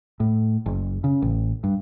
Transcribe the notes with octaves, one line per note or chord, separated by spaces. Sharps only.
A2
F#1
C#3
A1
G2